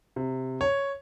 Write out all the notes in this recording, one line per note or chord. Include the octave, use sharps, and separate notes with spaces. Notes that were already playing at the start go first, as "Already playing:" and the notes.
C3
C#5